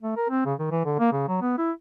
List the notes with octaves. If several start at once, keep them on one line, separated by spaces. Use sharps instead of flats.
A3
A#4
C4
C#3
D#3
E3
D3
A#3
C#3
F#3
B3
E4